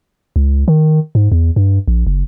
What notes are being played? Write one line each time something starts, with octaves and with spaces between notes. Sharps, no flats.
C#2
D#3
G#2
E2
G2
A#1
F#1